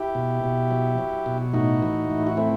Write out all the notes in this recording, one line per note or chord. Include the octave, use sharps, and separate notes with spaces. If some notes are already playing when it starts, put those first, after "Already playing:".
Already playing: E4 G4
B2
B2
F#3
F#3
B2
A2 D#4 F#4
E3
A2
F#4
A3 C4 E4